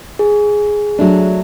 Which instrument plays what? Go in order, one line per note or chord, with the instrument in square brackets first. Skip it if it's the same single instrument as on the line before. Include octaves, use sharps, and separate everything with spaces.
[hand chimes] G#4
[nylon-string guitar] F#3 A3 D4